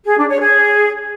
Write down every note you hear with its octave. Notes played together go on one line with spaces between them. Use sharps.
G#4
D4
C#5
G#4